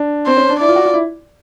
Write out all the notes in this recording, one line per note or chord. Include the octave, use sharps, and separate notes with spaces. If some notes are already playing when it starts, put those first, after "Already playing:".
Already playing: D4
C4 C5
C#4
D4
E4 D5
F4
F#4
F4
E4